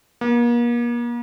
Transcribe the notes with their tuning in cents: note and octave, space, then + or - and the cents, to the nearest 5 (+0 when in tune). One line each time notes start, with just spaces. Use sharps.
A#3 +40